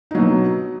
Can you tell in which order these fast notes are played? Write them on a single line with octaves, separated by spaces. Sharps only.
D#4 F#3 B2